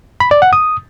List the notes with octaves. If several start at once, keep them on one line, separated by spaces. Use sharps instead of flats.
B5
D5
F#5
D#6